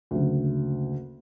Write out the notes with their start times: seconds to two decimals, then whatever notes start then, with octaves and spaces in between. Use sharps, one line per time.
0.11 F#1 D2